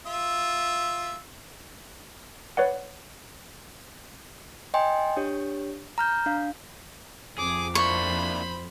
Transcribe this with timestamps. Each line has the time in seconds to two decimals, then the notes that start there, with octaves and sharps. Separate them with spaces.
0.06 F4 E5
2.57 B4 C#5 D5 F#5
4.74 D#5 G5 G#5 C6
5.17 D4 G4 C#5
5.98 A#5 F6 G6
6.26 D4 F5
7.38 F2 G#4 D6
7.75 A#3 D4 E4 C5 B5 C#6